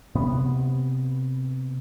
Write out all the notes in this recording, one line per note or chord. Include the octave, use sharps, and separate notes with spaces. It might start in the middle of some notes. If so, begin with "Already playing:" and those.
C3 B3